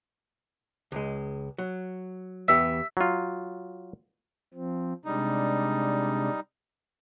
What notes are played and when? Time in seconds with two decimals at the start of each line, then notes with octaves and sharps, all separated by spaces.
0.92 C#2 G#3
1.58 F#3
2.48 E2 B3 G4 E5
2.97 F#3 F4
4.54 F3 C4
5.05 C3 G3 G#3 D4 D#4